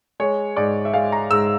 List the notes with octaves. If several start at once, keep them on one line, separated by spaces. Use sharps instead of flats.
G#3 C#5
G#2 D5
E5
G#3 F5
A#5
G#2 E6